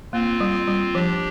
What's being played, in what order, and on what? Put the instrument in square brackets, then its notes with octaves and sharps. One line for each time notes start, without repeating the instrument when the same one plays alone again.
[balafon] A#3 [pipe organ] C4 F4
[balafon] G3
G3
[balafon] F3 [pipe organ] D4 G4